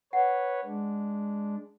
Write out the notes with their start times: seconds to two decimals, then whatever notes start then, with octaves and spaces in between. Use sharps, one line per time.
0.13 B4 C#5 F#5
0.65 G#3 D4